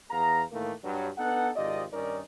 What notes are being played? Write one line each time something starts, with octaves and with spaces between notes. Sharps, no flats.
E2 B3 G#4 F5 A#5
A2 D#3 E3 A3 A#3
G2 F#3
B3 D4 D#4 A4 F#5
G#1 C3 F4 G4 D5 D#5
G2 D#3 C#4 D#4 A#4 D5